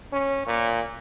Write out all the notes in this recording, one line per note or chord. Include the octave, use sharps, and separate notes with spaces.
C#4
A#2